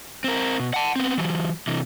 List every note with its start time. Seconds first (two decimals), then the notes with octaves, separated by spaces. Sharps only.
0.24 C4 A#4
0.60 B2
0.74 F#5 A5
0.96 B3 C4
1.18 E3 F#3
1.67 C3 E3